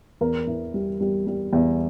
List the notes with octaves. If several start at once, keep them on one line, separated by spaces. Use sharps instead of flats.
E2 A#4
E3
G3
G3
G3
E2